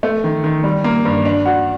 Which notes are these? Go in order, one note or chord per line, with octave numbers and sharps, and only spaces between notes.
A3
D#3
D#3
G3
A#3
G2
D4
F#4